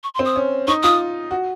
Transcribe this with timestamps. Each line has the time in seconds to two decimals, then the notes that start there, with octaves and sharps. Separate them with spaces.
0.04 C#6
0.14 C6
0.19 C4
0.25 D#6
0.36 C#4
0.67 D#4 C#6
0.83 F4 D#6
1.31 F#4